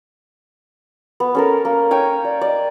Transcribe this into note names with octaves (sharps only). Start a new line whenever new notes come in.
B3
C#4 A4 A#4
A#3
C#5 G5 G#5
D5
D5 D#5